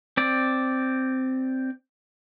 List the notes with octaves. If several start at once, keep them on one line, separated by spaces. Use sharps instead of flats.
C4 D5